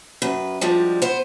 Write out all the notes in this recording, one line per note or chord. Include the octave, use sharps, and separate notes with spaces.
F#2 B4
D2 F3 G3 G#3
B3 C5